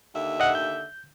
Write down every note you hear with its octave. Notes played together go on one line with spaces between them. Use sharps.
D#2 D3 E5
D#5 F#5
G6